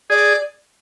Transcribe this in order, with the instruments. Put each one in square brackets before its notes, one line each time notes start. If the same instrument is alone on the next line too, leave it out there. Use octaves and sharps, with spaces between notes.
[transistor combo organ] G#4 [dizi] D5